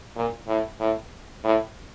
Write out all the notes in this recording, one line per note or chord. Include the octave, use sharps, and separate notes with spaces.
A#2
A2
A2
A2